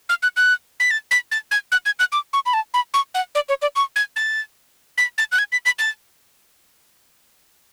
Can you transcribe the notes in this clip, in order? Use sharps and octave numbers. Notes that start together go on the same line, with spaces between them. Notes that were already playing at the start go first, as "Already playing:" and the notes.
F6
F#6
F#6
B6
A6
B6
A6
G#6
F#6
G#6
F#6
D6
C#6
B5
A5
B5
C#6
F#5
D5
C#5
D5
C#6
G#6
A6
B6
A6
F#6
G#6
B6
B6
A6